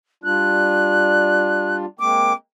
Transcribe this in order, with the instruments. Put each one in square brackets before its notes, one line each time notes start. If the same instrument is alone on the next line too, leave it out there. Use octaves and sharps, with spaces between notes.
[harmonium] G3 D4 F4 [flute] F#6
[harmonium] G#3 A#3 C4 [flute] D6